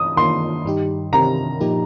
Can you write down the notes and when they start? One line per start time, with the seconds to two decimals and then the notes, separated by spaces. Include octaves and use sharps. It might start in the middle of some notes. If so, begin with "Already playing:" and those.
Already playing: D#6
0.17 D#3 A#3 F4 C6
0.65 G2 D#3 G3 D#4 G4
1.12 C3 D#3 C4 G4 A#4 A#5
1.60 A#2 F3 A#3 D#4 G4